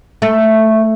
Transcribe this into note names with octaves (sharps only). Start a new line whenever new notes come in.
A3